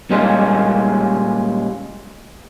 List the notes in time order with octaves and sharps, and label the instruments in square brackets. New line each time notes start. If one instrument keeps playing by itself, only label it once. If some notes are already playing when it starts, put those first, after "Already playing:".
[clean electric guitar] A#2 G3 G#3 A#3 C#4 F4